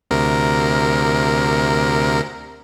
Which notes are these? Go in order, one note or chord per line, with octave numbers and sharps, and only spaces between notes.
D2 C3 A#4